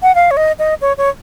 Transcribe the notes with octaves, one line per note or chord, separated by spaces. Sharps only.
F#5
F5
C#5
D#5
D#5
C#5
C#5